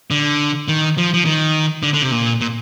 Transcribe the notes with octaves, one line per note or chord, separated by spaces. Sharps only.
D3
D#3
F3
F3
D#3
D3
D3
C3
A#2
A#2